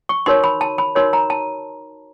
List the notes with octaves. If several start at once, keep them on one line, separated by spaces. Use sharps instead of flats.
C#6
D#4 F#4 A#4 C#5 C6
B5
A5
B5
D#4 F#4 A#4 C#5 C6
A#5
A5